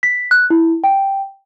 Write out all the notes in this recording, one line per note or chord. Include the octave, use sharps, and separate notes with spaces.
B6
F#6
E4
G5